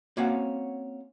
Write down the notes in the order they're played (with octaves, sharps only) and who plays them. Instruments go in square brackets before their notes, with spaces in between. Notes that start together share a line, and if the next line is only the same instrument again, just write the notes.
[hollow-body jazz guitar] A#3 C4 C#4 F#4 F5 F#5